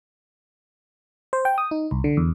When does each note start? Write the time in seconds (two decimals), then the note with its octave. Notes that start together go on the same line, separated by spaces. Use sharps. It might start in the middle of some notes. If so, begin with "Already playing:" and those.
1.33 C5
1.45 G5
1.58 D#6
1.71 D#4
1.91 C2
2.04 D3
2.17 E2